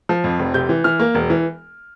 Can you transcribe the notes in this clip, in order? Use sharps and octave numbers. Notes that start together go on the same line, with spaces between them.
F3
F2
F1
C3 G6
E3
E3 F6
A#3
E1
E3